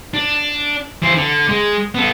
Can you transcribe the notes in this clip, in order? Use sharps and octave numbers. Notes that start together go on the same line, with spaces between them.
D4
E3 C5
D3
G#3
B3 A4